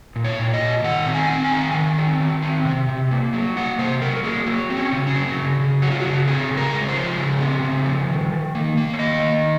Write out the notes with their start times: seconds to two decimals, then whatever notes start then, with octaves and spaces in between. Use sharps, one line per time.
0.16 A#2
0.24 C#5
0.39 A#2
0.54 D#5
0.61 A#2
0.84 D#3 F#5
1.07 C4
1.14 G#5
1.30 C4
1.44 G#5
1.52 D#3
1.74 D#3
1.98 C4
2.20 D#3
2.43 C4
2.65 C3
2.89 C3
3.11 A#3
3.33 F#3
3.56 A#3 F#5
3.78 C3 C5
4.02 F#3 A#4
4.16 A#4
4.24 A#3 G#4
4.47 F#3 F#4
4.70 C4
4.76 C#4
4.92 C#3
5.07 C#4
5.15 F#3
5.37 C#3
5.60 C#3
5.82 F#3 F#4
5.91 F4
6.00 C#3 F#4
6.27 C4 G#4
6.51 C#3
6.57 A#4
6.73 G#3
6.88 C5
6.96 F3
7.18 C#3
7.40 C4
7.63 C#3
7.86 F3
8.08 D#3
8.32 D#3
8.55 A#3
8.77 A#3
8.94 C#5
8.99 D#3 D#5
9.22 D#3